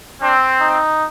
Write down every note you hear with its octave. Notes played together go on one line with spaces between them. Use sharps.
C4 D4
D#4